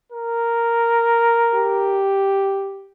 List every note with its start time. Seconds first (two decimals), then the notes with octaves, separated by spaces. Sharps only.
0.12 A#4
1.54 G4